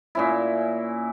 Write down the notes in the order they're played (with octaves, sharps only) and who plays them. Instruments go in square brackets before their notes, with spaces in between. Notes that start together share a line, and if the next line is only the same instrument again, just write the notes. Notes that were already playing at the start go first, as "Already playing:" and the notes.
[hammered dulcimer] A#2 C#4 E4